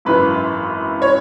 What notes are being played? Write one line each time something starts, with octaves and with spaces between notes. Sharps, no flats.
G#1 F#2 E3 B4
C#5